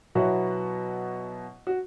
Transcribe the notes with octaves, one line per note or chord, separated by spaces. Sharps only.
B2 F#3 B3 E4 F#4
F#4